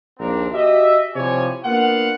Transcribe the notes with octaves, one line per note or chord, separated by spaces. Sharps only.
A#1 D#2 A#2 C4 D4 A#4
F#4 G4 D#5 E5
C3 F3 E4 C#5 D5 G#5
A#3 B3 D4 F4 F5 F#5